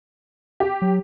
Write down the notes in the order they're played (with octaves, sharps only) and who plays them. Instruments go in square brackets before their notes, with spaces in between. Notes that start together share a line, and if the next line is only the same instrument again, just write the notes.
[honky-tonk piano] G4
[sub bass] F#3